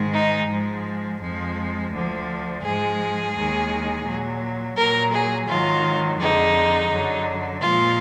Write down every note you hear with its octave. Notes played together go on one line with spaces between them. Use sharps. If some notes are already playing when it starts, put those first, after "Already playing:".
Already playing: G#2 D#3 G#3
D#4
G#2 F3 G#3
F2 F3 G#3
D2 D3 F3
G#2 F3 G#3 G#4
D#2 D#3 G#3
A#2 F#3
A#2 F#3 A#4
G#4
G#2 D#3 F#3 F4
F2 D3 F3 G#3 D#4
F#2 D3 F#3
A#2 F3 G#3 F4